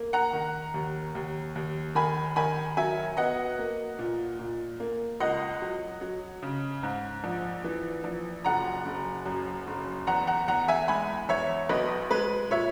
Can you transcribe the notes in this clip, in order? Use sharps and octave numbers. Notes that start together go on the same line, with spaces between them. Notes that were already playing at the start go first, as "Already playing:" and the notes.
Already playing: A#3
F#5 A#5
D#3
D#2
D#2
D#2
D#3 G#5 B5
D#3 G#5 B5
F#3 E5 G#5
B3 D#5 F#5
A#3
A#2
A#2
A#3
C#2 D#5 F#5
F#3
F#3
C#3
G#2
A#1
E3
A#1
F#1 F#5 A#5
F#1
F#2
F#1
E2 F#5 A#5
F#5 A#5
E2 F#5 A#5
E5 G#5
G#3 G#5 B5
E2 C#5 E5
B1 B4 D#5
G#3 B4
A#2 C#5 E5